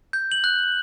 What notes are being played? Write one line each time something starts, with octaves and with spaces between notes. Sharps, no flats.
G6
F#7
F#6